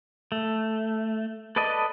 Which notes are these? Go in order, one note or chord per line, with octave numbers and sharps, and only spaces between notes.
A3
A4 B4 D5 D#5 A5